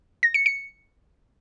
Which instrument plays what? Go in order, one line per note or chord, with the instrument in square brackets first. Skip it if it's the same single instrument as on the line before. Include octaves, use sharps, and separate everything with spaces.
[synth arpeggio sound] A#6
C#7
C#7